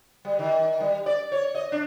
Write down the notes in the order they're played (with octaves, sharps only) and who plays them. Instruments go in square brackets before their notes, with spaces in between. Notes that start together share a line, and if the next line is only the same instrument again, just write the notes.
[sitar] G3
D#3
G3
D5
C#5
D#5
D4